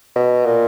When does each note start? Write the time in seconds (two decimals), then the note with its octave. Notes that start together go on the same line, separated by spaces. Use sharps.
0.15 B2
0.45 A#2